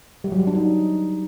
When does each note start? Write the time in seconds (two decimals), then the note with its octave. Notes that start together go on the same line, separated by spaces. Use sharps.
0.24 G3
0.32 F#3
0.40 G3
0.47 D4
0.55 D#4